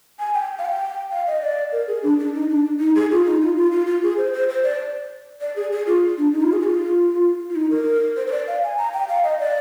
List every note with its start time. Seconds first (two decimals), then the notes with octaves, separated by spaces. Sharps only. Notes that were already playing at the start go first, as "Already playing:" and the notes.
0.19 G#5
0.34 G5
0.59 F5
0.65 G5
1.12 F5
1.27 D#5
1.42 D5
1.72 A#4
1.88 G#4
2.03 D4
2.19 D4
2.34 D#4
2.50 D4
2.80 D#4
2.95 G#4
3.11 F4
3.26 D#4
3.42 F4
3.57 F4
3.72 F4
3.87 F4
4.03 G#4
4.18 C5
4.33 C5
4.49 C5
4.64 D5
5.41 D5
5.56 G#4
5.72 G#4
5.87 F4
6.18 D4
6.33 D#4
6.43 F4
6.53 G#4
6.63 F4
7.50 F4
7.56 D#4
7.70 A#4
8.17 C5
8.27 C5
8.32 D5
8.48 F5
8.64 G#5
8.78 A#5
8.94 G5
9.09 F5
9.24 D#5
9.40 D5